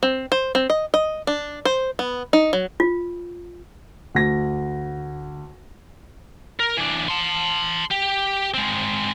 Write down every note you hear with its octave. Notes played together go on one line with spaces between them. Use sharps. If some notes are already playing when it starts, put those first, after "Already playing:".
C4
C5
C4
D#5
D#5
D4
C5
B3
D#4
F#3
F4
D2 A#6
A#4
E3 D4
A5 C6
G4
G#3 C4